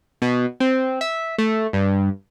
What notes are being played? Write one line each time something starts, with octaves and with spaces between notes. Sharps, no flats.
B2
C4
E5
A3
G2